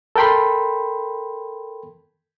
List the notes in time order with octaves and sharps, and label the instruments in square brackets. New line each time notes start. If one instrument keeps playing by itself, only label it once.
[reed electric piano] A4 A#4 G5 B5 C6